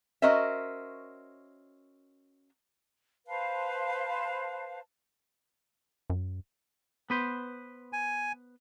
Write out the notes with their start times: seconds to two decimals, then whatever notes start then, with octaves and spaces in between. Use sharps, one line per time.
0.22 C#4 F#4 A#4 C5 D#5 E5
3.27 B4 C5 F5 A5
6.10 F#2
7.10 B3 B4 C5
7.93 G#5